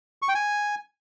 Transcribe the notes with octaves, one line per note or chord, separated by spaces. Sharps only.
C#6
G5
G#5